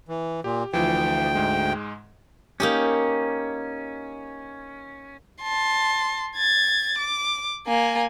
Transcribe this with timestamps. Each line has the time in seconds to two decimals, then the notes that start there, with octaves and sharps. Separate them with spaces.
0.09 E3
0.44 A#2 G4
0.73 D2 E3 F3 G5
1.35 G#2 G#3
2.60 A#3 C#4 D#4 G4
5.43 A5 C6
6.37 G#6 A6
6.98 D6
7.67 A#3 G#5